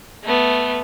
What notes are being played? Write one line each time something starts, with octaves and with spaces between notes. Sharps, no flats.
A3 B3